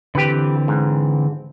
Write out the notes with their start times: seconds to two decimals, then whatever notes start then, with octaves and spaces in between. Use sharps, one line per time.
0.15 D3 E3 C4 G4 B4
0.68 G#2